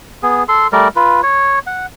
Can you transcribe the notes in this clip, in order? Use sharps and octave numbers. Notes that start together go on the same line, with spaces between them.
B3 G#4
A4 C6
G3 A3 A#4 D5
F4 B4
C#5
F#5